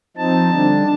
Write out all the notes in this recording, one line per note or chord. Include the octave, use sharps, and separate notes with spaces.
F3 C4 D#4 A5
D3 G3 D4